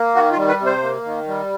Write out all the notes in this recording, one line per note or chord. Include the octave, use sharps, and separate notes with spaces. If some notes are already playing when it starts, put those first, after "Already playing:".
Already playing: A#3
D#3 F#4
F4
G3
B4
C3
C5
A#3
D#3
G3